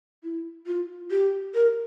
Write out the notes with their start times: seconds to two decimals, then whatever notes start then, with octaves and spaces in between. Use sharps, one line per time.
0.23 E4
0.67 F4
1.11 G4
1.54 A#4